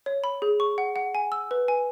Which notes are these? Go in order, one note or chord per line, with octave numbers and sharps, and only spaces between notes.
C#5
B5
G#4
C#6
F#5
F#5
G#5
E6
B4
G#5